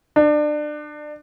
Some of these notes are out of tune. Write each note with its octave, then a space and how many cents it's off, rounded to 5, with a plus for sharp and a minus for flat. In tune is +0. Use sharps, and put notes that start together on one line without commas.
D4 +30